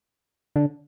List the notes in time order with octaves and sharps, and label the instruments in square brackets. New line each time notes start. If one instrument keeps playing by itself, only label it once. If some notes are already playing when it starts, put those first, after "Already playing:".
[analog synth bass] D3